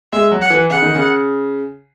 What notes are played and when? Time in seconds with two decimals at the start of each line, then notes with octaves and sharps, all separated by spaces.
0.13 G#3 E5
0.31 F#3
0.42 F#5
0.50 E3
0.70 C#3 F#5
0.82 D#3
0.95 C#3